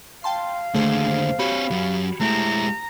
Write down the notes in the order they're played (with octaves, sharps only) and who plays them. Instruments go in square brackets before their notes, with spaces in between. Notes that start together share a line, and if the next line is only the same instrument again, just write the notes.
[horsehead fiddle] F5 [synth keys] G5 A5 C6
[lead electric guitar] D#2 D3 [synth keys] A3 G#4 C5
[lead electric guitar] C4 C#5 [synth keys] F#4 G4 B5
[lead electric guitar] F#2 F#3
[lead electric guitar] G#3 E4 [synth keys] A3 G4 [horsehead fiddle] A#5